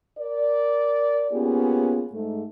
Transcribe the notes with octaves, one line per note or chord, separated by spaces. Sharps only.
A#4 D5
A#3 B3 C#4 F4 G4 G#4
G#2 A3